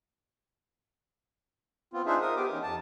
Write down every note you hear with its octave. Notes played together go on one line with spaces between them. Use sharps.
B3 C4 F4
D4 D#4 F4 G#4 C5 E5
A#4 D#6
B3 G4 D6
E3 C#4 D#4
F2 A5